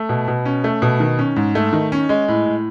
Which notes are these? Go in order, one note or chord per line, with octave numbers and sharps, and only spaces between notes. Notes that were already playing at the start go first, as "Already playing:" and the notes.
Already playing: A3
B2
B2
C#4
A3
B2
D#3
C#4
G#2
A3
D#3
C#4
G#3
A2
A2